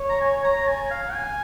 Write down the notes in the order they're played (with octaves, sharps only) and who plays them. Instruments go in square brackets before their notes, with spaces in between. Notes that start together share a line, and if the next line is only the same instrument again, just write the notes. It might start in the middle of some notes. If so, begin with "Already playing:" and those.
Already playing: [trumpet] C#5
[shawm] A#5
G#5
A#5
G#5
F5
G#5